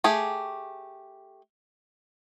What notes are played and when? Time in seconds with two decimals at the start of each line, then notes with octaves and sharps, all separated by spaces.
0.04 A3 G4 G#4